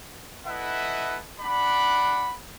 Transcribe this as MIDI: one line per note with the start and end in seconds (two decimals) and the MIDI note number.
0.46 1.19 64
0.46 1.19 69
0.46 1.19 71
0.46 1.19 75
0.46 1.19 76
0.46 1.19 78
1.40 2.34 62
1.40 2.34 74
1.40 2.34 78
1.40 2.34 83